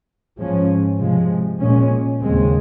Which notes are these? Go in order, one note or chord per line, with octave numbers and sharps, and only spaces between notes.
G#2 F3 G#3 C#4
C3 F3 G#3
A#2 G#3 C#4
D#2 C#3 G#3 C4